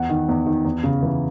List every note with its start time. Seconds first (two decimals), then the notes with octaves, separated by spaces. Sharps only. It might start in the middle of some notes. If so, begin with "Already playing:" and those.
Already playing: E2 F#5
0.09 D#3
0.29 E2
0.46 D#3
0.65 E2
0.83 C#3
1.03 E3